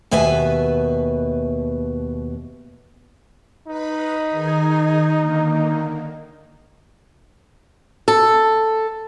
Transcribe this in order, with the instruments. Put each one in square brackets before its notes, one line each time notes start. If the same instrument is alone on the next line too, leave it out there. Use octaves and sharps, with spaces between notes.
[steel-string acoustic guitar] D#2 B2 B4 E5 G#5
[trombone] D#4 [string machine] B4 B5
[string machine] D#3 G#4 G#5
D3 D#3 A#3
[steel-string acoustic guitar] A4